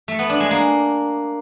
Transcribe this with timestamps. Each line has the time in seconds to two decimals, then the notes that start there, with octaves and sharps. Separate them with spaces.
0.08 A3
0.19 B3
0.30 D4
0.40 G#3
0.51 A#3